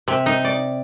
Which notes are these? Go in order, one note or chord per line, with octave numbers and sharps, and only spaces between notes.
C3
D#4
D5